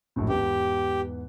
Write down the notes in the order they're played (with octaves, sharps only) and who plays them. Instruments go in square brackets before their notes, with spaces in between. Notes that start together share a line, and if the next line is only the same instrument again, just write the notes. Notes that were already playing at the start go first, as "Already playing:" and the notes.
[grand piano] A#1 F#2 A2
[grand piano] E2 G#2 B3 [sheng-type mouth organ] G4